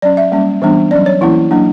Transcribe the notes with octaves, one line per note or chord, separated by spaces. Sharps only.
F#3 C#4 D5
E5
G3 A#3 C#4
E3 G3 B3 D4
F#3 C#4 D5
C#5
E3 A#3 C#4 E4
F#3 A#3 D4